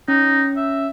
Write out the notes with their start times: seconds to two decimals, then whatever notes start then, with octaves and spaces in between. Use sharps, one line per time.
0.08 C#4 D#4
0.56 E5